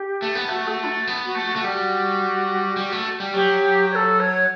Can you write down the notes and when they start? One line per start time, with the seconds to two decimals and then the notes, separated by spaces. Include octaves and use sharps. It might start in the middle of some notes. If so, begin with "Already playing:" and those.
Already playing: G4
0.22 A3
0.35 B3
0.49 A3 F#4
0.67 A4
0.71 F#4
0.84 D4
0.88 F#4
1.07 B3
1.26 F#4
1.35 A3
1.45 F#4
1.56 A3
1.64 G3 F#4
2.77 G3
2.92 A3
3.20 G3
3.34 F#3 G4
3.91 C#5
3.95 A4
4.20 C#5